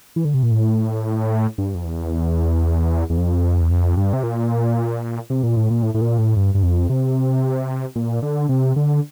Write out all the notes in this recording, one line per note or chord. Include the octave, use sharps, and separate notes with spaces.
E3
D3
C3
A#2
A2
G2
F2
E2
E2
F2
E2
F2
G2
C3
A#2
C3
A#2
A2
A#2
A2
A2
A#2
A2
G2
G2
F2
C3
A#2
D3
C3
D3